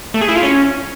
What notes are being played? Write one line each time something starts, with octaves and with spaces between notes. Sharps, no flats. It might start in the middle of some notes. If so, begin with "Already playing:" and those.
A3
G#4
E4
F4
C#4